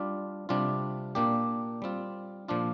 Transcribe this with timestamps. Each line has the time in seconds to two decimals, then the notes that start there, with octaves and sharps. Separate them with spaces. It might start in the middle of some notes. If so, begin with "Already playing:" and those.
Already playing: G3 D4 F4
0.49 C3 G3 D4 F4
1.15 A#2 A#3 D4 G4
1.82 G3 C4 F4
2.48 A#2 F3 D4 F4